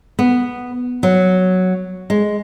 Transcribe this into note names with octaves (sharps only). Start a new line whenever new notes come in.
B3
F#3
G#3